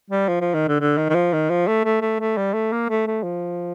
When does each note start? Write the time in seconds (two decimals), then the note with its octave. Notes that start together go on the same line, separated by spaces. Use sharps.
0.10 G3
0.28 F3
0.41 F3
0.54 D#3
0.68 D3
0.81 D3
0.97 D#3
1.10 D#3
1.15 F3
1.33 D#3
1.50 F3
1.67 A3
1.84 A3
2.01 A3
2.20 A3
2.37 G3
2.54 A3
2.72 A#3
2.89 A3
3.07 A3
3.23 F3